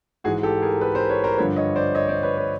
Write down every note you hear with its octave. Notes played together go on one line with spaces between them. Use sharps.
G#2 E3 F#4 G#4
G4 A4
G#4 A#4
A4 B4
A#4 C5
B4 C#5
A#4 C5
G2 D3 F3 B4 C#5
C#5 D#5
C5 D5
C#5 D#5
C5 D5
B4 C#5
B4 C#5